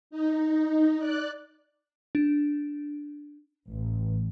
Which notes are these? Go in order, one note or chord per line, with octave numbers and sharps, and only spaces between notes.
D#4
D5 F#6
D4
A1